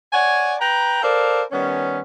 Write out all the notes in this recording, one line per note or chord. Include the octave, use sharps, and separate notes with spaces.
C#5 D5 F#5 G#5
B4 G5 A#5
A4 A#4 C5 D5 F5
D#3 G3 B3 C#4